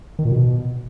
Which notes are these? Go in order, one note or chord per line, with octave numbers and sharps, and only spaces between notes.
D#3
A#2
B2